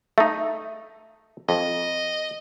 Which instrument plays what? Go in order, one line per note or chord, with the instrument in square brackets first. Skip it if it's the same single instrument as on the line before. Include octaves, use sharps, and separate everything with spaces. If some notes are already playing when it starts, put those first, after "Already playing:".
[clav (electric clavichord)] A3 D#4 [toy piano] E5
[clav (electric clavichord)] F2 [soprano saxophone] D#5